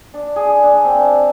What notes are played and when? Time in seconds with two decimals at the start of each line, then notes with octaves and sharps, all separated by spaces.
0.14 D4
0.36 G#4
0.63 D4
0.85 C4
0.99 A5